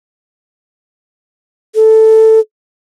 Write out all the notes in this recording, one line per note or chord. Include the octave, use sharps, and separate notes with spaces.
A4